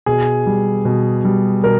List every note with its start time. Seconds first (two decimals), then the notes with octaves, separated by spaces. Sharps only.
0.06 B2 G#4
0.46 G3
0.85 B2
1.25 G3
1.64 B2 A#4